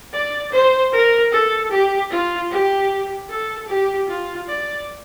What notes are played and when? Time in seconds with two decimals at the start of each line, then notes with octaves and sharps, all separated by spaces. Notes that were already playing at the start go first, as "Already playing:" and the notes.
0.13 D5
0.52 C5
0.93 A#4
1.32 A4
1.71 G4
2.11 F4
2.51 G4
3.30 A4
3.68 G4
4.08 F4
4.48 D5